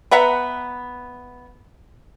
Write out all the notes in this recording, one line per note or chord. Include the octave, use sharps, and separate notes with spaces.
B3 E5 F#5 A#5